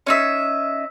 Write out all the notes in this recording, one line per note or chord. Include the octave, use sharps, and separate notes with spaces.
C#4 D#4 E5